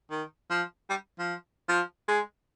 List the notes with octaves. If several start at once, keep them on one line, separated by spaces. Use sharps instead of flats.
D#3
F3
G3
F3
F3
G#3